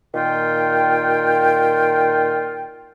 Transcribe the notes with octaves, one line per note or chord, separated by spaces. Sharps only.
A#2 D#3 F4 G5